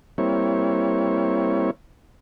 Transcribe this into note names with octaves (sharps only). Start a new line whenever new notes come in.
G3 A#3 C4 E4 C#5